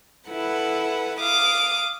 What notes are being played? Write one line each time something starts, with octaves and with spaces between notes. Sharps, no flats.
E4 A4 B4 F#5
F5 D6 D#6